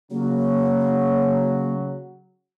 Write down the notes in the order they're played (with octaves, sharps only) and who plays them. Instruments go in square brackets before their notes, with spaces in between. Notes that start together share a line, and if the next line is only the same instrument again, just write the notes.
[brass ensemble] C#3 F#3 [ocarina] A#3